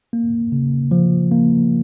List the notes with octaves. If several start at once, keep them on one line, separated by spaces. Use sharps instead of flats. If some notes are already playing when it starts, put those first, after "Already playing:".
A#3
C#3
F3
A#3